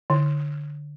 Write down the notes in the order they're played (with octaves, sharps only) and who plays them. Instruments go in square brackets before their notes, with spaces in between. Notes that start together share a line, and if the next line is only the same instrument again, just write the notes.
[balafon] D3